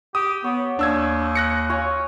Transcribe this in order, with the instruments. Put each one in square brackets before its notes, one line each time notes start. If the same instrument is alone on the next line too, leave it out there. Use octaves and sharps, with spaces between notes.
[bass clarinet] G4 [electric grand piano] D#6
[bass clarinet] B3 [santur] C#5
[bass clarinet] D#2 [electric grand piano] D4 E6 G#6
[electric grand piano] F#6 A#6 C#7
[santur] F4 C#5 G#5